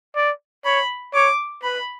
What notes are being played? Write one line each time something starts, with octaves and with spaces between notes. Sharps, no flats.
D5
C#5 B5
C#5 D6
B4 B5